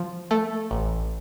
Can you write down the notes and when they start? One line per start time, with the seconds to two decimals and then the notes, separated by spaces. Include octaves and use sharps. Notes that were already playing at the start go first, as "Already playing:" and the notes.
Already playing: F3
0.31 A3
0.71 A1